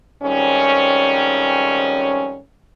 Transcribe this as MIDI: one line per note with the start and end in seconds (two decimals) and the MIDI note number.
0.23 2.39 41
0.23 2.39 44
0.23 2.39 51
0.23 2.39 55
0.23 2.39 61